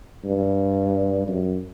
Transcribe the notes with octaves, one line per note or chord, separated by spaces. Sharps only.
G2
F#2